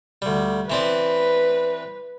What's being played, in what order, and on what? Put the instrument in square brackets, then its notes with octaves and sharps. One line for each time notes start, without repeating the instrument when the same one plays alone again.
[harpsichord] D2 G3
[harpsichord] E3 C4 D5 [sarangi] B4